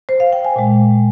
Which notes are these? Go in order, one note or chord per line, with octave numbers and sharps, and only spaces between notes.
C5
F5
G5
G#5
A#2 G#3